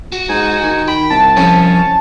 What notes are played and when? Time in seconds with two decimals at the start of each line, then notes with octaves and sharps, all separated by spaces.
0.12 F#4
0.29 G#2 D#4 G#5
0.63 D#3
0.88 G5 B5
1.10 C2 A5
1.37 F3 C#4